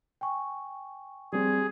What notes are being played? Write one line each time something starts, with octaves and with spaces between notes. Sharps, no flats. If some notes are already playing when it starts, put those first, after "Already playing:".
G5 G#5 C#6
G3 C4 G#4